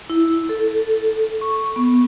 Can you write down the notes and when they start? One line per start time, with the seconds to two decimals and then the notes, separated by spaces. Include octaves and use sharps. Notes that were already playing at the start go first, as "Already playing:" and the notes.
0.10 E4
0.49 A4
1.41 C#6
1.76 B3